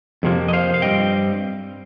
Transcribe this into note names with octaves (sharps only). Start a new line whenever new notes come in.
F2 C3 F3 A#3
D#5
C5 F5
F5
G2 G3 C4 D#5 G5